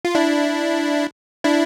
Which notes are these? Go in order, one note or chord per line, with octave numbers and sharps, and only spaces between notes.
F4
D4 E4
D4 E4